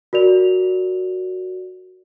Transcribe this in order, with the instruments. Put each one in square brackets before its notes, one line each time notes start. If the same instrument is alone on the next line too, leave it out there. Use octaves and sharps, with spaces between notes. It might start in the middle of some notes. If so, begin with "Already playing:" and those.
[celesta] F#4 A#4 D5 F7